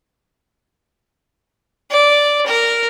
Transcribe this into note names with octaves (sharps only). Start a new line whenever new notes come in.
D5
A#4